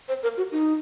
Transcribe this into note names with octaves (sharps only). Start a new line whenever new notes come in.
C5
A#4
F#4
D#4